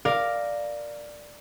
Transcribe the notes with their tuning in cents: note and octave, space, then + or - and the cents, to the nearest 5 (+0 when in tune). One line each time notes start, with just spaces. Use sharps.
A#4 +0 D5 +5 F5 +0